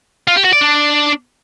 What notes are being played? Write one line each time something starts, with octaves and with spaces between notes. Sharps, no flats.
F4
G4
F#4
D5
D4